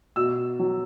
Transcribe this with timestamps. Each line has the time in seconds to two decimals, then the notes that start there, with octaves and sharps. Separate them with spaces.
0.16 B2 E6
0.59 F#3